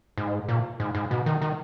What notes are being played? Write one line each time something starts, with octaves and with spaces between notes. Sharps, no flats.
G#2
A#2
G#2
G#2
B2
D#3
D#3